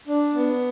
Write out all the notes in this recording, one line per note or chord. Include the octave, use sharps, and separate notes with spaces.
D4
B3